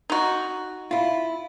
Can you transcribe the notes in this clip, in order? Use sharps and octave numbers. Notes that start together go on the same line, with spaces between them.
D#4 F#4
E4 F4